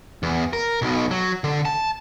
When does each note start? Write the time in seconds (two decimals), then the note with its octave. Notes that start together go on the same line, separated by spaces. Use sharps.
0.23 E2
0.53 A#4
0.82 B1 B2
1.11 F#3
1.44 D3
1.65 A5